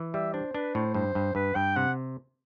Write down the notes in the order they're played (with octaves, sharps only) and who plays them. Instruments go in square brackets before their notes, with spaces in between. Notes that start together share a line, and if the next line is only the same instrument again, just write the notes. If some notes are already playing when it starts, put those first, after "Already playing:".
Already playing: [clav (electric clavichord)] E3
[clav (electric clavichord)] G3 [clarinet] E5
[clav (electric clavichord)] D4 [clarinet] C5
[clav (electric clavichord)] D4 [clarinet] B4
[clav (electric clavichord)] A2 [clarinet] C5
[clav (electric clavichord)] G2 [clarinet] C5
[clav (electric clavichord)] G2
[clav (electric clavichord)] G2 [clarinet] B4
[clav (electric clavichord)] G2 [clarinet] G5
[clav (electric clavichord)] C3 [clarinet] F#5